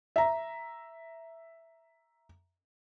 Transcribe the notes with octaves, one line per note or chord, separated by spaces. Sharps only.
E5 A#5